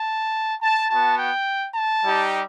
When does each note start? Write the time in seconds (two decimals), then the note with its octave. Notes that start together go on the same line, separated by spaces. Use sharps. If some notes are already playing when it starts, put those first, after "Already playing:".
Already playing: A5
0.63 A5
0.90 B3 F#4 A5
1.18 G5
1.75 A5
2.03 G3 D#4 G4